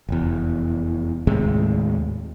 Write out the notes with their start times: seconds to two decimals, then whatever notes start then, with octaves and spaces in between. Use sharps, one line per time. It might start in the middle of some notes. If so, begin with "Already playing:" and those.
0.09 F1 E2
1.27 D#2 A2 C3 G#3